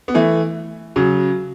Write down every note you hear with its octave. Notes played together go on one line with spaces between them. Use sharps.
B3
E3 A3
C#3 F#3